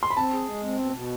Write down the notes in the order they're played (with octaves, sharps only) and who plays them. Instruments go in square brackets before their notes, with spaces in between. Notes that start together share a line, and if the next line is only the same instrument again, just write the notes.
[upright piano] C6
B5
[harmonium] C4 [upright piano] A5
[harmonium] G#4
G#3
C4
B2
B2